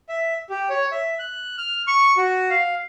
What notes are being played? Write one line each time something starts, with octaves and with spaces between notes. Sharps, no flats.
E5
G4
C#5
E5
F#6
F6
C#6
F#4
F5